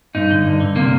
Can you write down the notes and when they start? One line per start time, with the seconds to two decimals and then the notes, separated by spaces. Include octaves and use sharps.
0.15 G2 D#4
0.31 D3
0.46 G2
0.61 D3
0.76 C3 A#3